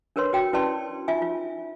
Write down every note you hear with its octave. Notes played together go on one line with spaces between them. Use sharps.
D4 A#4 B4 C#5 C6
F#4 G5
C#4 E4 B4 D5 A5 C6
D#4 F4 E5 G#5
F4